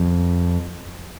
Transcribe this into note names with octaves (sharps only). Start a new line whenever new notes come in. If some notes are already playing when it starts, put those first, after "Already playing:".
Already playing: F2